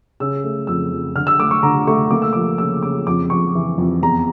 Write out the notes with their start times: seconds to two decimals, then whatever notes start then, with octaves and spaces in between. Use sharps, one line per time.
0.20 C#3 E6
0.44 A3
0.67 F2 E6
0.92 F2
1.15 D3 F6
1.27 E6
1.39 A3 D6
1.51 C#6
1.63 D3 A#5
1.87 A3 C#6
2.11 A#3 D6
2.22 E6
2.33 F3 D6
2.58 C#3 E6
2.82 C#3 D6
3.07 F2 D6
3.30 F2 C#6
3.55 E3
3.78 F2
4.02 E2 A#5